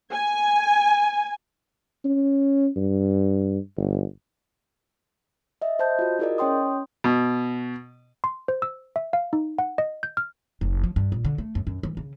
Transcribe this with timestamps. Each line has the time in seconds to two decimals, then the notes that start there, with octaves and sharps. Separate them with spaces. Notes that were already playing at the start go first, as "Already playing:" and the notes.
0.12 G#5
2.05 C#4
2.76 G2
3.77 G1
5.62 D#5 E5
5.79 C5 D#5 A5 G6
5.99 F4 F#4
6.19 E4 G#4 A#4 D5 D#5
6.38 C#4 C#5 G5 C6 D#6
7.04 B2
8.24 C6
8.48 C5
8.62 E6
8.96 E5
9.13 F5
9.33 D#4
9.59 F#5
9.78 D#5
10.03 G6
10.17 F6
10.61 F#1
10.84 F3
10.96 G2
11.12 A#2
11.25 D3
11.38 A3
11.55 F#2
11.67 F#2
11.83 E3
11.97 C#3